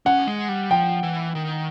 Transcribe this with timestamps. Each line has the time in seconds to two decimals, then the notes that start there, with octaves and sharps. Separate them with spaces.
0.06 C#4 F#5
0.27 G#3
0.49 G3
0.70 F3 G5
1.03 E3
1.35 D#3